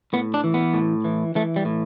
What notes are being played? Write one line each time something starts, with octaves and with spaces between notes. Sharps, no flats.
A2 B3
D4
E3
B3
A2
E3
E3 A3
G3
A2